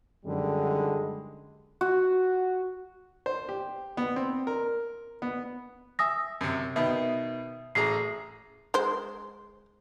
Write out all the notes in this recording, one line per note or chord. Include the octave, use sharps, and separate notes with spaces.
F#2 D3 D#3 G3 G#3
F#4
C5
G4
B3
C4
A#4
B3
E5 G#5 D#6 A#6
F#2 C3
B2 D#3 B3 E5
A1 G#4 A#5 C7
G#3 C5